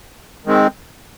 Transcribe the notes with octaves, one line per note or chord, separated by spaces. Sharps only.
D#3 G#3 C4